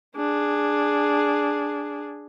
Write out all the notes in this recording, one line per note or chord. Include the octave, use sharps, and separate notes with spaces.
D4 G#4